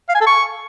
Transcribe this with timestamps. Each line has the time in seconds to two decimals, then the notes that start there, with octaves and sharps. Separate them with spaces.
0.09 F5
0.15 G#5
0.21 A4
0.27 C#6